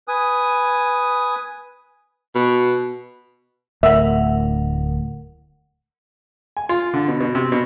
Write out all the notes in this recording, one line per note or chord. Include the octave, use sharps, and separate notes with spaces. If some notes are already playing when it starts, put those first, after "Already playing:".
B4 G#5 D#6
B2
D1 D2 A2 A#4 E5 F#5
G#5
F4
D3
B2
B2
C3
B2